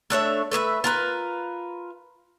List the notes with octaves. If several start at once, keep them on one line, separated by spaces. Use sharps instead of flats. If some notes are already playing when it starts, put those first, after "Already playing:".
A3 D4 C#5 E5
A3 B4 D#5 E5
F4 A#4 B4